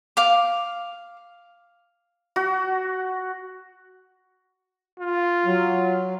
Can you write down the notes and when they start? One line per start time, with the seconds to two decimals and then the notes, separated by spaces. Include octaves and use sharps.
0.17 F5 D6
2.36 F#4
4.99 F4
5.45 F#3